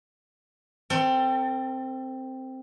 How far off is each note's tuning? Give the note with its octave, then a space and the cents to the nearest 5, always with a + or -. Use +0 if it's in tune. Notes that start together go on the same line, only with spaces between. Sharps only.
C4 +0 A4 +35